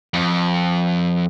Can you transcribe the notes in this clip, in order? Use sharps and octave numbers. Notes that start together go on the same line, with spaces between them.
F2